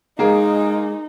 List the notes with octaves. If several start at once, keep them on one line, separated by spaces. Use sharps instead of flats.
G#3 A#3 D#4 G#4 A#4